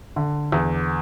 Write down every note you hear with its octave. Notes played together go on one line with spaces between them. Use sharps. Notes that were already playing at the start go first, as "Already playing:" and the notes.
D3
E2